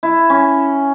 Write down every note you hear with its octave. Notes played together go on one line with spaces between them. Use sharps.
E4
C#4